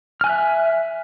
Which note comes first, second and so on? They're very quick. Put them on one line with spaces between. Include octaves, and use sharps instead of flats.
F6 G#5 F#6 E5